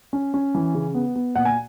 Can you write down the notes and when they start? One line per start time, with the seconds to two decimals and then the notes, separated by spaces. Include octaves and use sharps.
0.13 C#4
0.34 C#4
0.55 E3
0.74 C#3
0.95 B3
1.16 B3
1.35 A#2 F#5
1.45 G#5